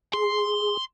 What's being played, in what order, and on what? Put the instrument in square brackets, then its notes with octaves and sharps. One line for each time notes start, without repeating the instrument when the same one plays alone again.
[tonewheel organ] G#4 [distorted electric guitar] C6